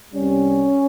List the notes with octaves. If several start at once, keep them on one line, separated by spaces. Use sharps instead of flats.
C2 C3 G3 C#4